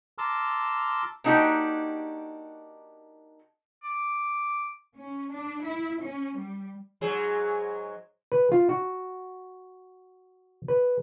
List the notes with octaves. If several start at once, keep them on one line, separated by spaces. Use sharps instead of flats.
A5 A#5 C6 D6 E6 F6
A#3 D4 D#4 F#4 G4
D6
C#4
D4
E4
C#4
G3
G#2 F#3 G#4
B4
F4
F#4
B4